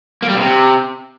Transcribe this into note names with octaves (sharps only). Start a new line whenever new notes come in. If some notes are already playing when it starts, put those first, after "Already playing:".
A#3
G3
B2
C3